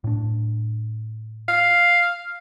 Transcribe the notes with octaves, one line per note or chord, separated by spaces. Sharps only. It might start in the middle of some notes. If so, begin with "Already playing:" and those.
A2 D4
F5